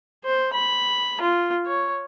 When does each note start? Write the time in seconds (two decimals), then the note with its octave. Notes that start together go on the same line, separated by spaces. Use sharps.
0.24 C5
0.53 B5
1.21 F4
1.66 C#5